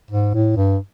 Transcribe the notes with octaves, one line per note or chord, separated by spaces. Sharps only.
G#2
A2
G2